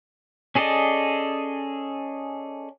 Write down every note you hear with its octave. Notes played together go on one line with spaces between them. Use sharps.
C#4 G#4 A4 D5 D#5